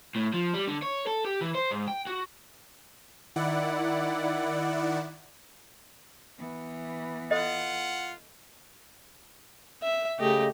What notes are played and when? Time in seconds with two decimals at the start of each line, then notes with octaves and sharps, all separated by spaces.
0.16 A2
0.34 F3
0.54 G3
0.68 D3
0.83 C#5
1.07 A4
1.25 G4
1.41 E3
1.55 C5
1.71 G#2
1.88 G5
2.07 F#4
3.36 D#3 E4 D5 F#5
6.39 E3 B3
7.31 F4 A4 D#5 F#5
9.83 E5
10.20 C#3 A3 G4 D#5